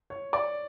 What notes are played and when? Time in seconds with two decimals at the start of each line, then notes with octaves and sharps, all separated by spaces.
0.10 C#5
0.33 D5